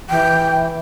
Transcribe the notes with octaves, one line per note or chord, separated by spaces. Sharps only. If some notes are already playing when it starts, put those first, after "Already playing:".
E3 G5